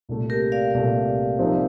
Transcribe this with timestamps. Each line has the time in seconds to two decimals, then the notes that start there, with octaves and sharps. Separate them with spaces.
0.09 C2 A#2 A3
0.30 G4 A#4
0.52 D5 F5
0.74 C2 A#2 A3
1.39 C2 C3 F3 C4 D#4